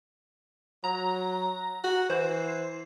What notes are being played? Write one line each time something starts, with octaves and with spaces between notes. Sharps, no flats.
F#3 A#5
F#4
E3 C5